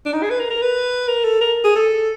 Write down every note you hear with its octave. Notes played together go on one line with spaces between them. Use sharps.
D4
D#4
G#4
B4
A#4
A#4
B4
A#4
A4
A#4
G#4
A4